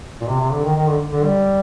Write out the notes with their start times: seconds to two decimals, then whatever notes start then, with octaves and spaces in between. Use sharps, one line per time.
0.21 A#2
0.29 C3
0.40 C3
0.52 D3
0.64 D#3
0.77 D#3
0.88 D3
1.13 D3
1.24 G3